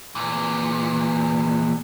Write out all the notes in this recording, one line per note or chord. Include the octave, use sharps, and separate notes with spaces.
E2 A#2